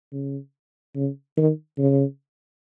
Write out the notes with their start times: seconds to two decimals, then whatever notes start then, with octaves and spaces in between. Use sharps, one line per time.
0.12 C#3
0.96 C#3
1.37 D#3
1.78 C#3